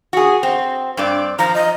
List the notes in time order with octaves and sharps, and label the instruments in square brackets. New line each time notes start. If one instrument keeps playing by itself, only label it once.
[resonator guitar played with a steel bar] F#4 G#4
C4
G2 C4 D5
[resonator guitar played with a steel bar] F3 [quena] A#5
[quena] D#5